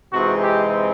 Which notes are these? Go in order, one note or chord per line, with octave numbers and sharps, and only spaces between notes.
C3 E3 G#3 C4 D#4 F#4
G4